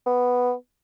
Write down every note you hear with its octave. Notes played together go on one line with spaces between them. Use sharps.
B3